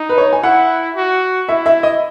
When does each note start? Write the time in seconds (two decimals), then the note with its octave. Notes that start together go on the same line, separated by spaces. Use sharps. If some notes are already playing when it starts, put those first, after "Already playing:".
Already playing: D#4
0.09 B4
0.18 C#5
0.33 G#5
0.43 E4 F#5
0.96 F#4
1.49 E4 E5
1.66 E5
1.83 D#5